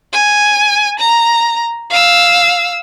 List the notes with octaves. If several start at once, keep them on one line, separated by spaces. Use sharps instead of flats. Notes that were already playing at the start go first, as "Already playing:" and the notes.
G#5
A#5
F5 E6